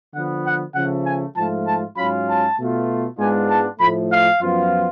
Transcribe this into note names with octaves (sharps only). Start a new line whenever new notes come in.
D3 F3 B3 F#5
F#5
C#3 F3 A3 F#5
G#5
G#2 F3 A3 F4 A5
A5
G#2 F#3 C#4 F4 B5
A5
B2 A3 F4
G#2 G#3 B3 D4 F4 G#5
A5
A2 F3 A3 B5
F5
F#2 F3 B3 F4